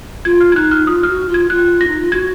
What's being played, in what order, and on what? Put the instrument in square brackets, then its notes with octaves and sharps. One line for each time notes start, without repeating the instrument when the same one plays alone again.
[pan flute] F4 [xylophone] G#6
[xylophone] F6
G#6
[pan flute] D#4 [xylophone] F#6
[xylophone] F6
[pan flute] F4 [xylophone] D#6
[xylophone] F6
[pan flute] F#4
F4
[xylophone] G#6
[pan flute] F4 [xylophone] F#6
[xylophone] A#6
[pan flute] D#4
F4
[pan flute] F#4 [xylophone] G#6